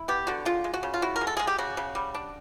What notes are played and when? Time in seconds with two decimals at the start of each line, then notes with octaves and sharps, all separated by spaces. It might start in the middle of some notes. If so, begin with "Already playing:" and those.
Already playing: E4
0.08 B3 G4
0.27 D3 F#4
0.45 G#3 F4
0.64 G#3
0.74 F#4
0.83 C#3
0.94 F4
1.02 E4 F#4
1.16 A#4
1.21 G#3
1.27 A4
1.37 G#3 G#4
1.47 G4
1.58 C#3 F#4
1.77 C#3
1.95 G3
2.14 D4